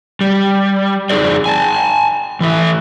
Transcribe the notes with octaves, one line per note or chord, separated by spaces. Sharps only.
G3
F2 C4 D#4 G#4 A#4 D5
G#5 A5
E3 A3 E5